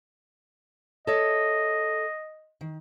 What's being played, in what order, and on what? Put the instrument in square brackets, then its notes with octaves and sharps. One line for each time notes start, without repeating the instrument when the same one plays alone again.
[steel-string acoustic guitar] A4 C#5 E5 [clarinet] D#5
[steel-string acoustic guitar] D#3